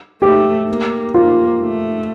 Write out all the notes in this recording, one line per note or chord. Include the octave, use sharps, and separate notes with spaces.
A3 G4
A#3
A#3 F4
A3